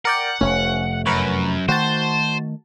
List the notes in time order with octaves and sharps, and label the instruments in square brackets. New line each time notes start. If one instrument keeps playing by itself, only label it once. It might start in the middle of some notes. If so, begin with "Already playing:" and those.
[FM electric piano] A#4 D5 G5 [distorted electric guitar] F#5
[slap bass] F1 A3 [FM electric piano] C#4
[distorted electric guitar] F#2 [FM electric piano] A#4 B4 C#5
[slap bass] D#3 A3 [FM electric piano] F#4 A5 [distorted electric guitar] C5